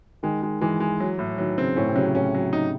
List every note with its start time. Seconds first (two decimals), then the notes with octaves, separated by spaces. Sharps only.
0.23 D#3 G#3
0.43 G#3
0.61 E3 G#3
0.80 G#3
1.00 F#3
1.19 A2
1.38 D#3 F#3
1.58 C#3 C4
1.77 A2 C#4
1.87 C3
1.95 C#3 F#3
2.15 A2 C#4
2.35 F#3
2.53 D#4